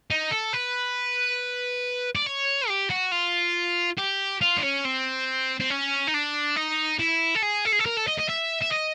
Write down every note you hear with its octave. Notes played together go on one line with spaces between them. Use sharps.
D#4
A4
B4
D5
C#5
G4
F#4
F4
G4
F4
D4
C#4
C4
C4
C#4
D#4
D4
D#4
E4
A4
G#4
A4
G#4
A4
A#4
A4
D#5
D#5
E5
E5
D#5